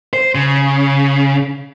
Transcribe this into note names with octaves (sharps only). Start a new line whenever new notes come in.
C5
C#3